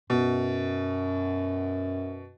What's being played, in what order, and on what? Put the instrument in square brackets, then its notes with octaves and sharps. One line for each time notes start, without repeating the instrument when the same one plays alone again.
[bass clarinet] F#2 [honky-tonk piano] B2